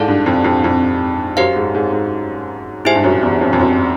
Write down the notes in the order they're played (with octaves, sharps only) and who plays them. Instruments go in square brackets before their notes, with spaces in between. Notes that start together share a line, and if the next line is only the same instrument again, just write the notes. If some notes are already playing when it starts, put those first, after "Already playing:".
Already playing: [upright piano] G#2 [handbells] E4 A4 D5 F5 A5
[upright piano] G2
F2
F2
F2
[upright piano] F#2 [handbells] G4 C5 F5
[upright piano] G#2
G#2
G#2
[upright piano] G#2 [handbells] E4 G4 C5 E5 G#5
[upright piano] G2
F#2
E2
F2
F2
F#2